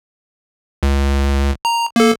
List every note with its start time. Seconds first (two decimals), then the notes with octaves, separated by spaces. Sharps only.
0.83 C#2
1.65 A#5
1.96 A#3 A4